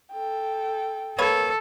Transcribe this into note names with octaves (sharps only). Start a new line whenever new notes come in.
A4 G5
A#3 A4 B4 C#5